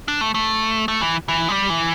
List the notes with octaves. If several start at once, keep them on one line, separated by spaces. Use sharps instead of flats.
D4
A3
A3
A3
E3
E3
G3
E3